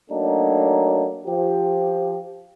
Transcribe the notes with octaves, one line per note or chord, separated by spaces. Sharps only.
F#3 A3 A#3 D4 D#4
F3 G4